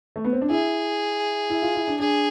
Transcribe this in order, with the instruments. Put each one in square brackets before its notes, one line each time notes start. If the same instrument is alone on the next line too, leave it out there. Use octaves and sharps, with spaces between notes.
[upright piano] A3
B3
C4
D4
[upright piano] E4 [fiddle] G#4
[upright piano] E4
F4
E4
D4
[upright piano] D4 [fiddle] G#4